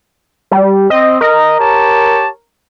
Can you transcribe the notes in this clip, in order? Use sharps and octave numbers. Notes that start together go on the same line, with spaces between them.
G3
C4 D#5
A#4 D#5
G4 C#5 A5